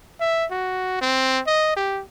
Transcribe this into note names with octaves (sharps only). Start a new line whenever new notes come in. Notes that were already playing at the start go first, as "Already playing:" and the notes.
E5
F#4
C4
D#5
G4